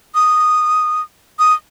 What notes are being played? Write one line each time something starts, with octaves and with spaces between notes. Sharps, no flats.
D#6
D#6